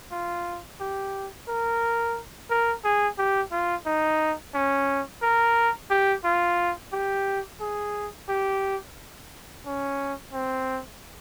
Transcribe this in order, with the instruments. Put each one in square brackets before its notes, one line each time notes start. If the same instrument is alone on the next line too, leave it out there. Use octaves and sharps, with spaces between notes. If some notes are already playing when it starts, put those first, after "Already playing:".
[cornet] F4
G4
A#4
A#4
G#4
G4
F4
D#4
C#4
A#4
G4
F4
G4
G#4
G4
C#4
C4